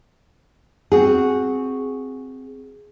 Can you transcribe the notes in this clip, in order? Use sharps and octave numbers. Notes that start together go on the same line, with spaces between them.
C4 F#4 G#4